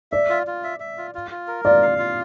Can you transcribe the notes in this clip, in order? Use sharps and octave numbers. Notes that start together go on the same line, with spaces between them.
D5 E5
F4
F4
E5
E5
F4
F4
F4
A#4
F4 D5
F5
F4